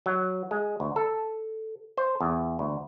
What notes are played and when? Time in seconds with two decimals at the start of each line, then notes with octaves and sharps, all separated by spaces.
0.06 F#3
0.51 G#3
0.80 D2
0.96 A4
1.97 C5
2.21 E2
2.59 D2